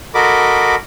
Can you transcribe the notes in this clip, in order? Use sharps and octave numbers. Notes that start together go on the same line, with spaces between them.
F#4 A4 A#4 D#5 B5 D6